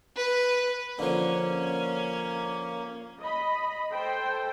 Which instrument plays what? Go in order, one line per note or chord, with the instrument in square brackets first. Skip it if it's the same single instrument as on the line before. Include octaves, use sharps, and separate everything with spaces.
[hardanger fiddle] B4
[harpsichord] D3 F3 [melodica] A#3 [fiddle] C#4
[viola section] D#5 B5
A4 C5 G5